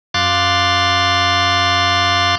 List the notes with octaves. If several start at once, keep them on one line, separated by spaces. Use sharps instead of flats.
F#2 F5 C6 D6 F#6 A6